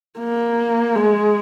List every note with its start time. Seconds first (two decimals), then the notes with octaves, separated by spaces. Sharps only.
0.19 A#3
0.95 G#3